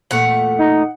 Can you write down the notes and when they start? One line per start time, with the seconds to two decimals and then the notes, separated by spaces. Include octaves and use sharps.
0.11 E2 A#2 A3 F#5
0.59 D#4